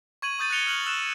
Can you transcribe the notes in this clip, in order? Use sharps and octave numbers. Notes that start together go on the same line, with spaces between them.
C#6 G#6 D#7 F#7
C#6 D#6 G6 A6 D#7
F#6 A6 A#6 C#7 F7 G7
F6 F#6 F7 F#7
E6 F#6 E7